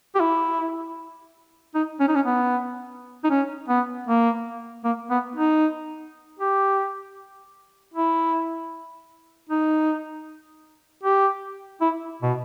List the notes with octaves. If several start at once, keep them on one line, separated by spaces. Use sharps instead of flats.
G4
E4
D#4
C#4
D#4
C#4
B3
D#4
C#4
B3
A#3
A#3
B3
D#4
G4
E4
D#4
G4
E4
B2